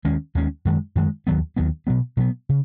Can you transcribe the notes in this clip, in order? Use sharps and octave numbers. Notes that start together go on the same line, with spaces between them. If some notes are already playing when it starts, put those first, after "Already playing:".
D#2 D#3 G#3 C#4
D#2 D#3 G#3 C#4
F#2 D#3 G#3
F#2 D#3 G#3
D#2 D#3 F#3 B3
D#2 D#3 F#3 B3
B2 F#3 B3
B2 F#3 B3
C#3